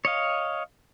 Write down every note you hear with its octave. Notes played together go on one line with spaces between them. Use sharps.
C#5 D#5 F5